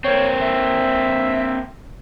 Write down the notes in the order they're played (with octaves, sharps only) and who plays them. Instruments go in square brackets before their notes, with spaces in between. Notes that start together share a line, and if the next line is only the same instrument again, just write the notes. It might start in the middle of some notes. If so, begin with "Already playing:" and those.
[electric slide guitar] A#3 C4 [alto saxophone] C#5
[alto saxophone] E5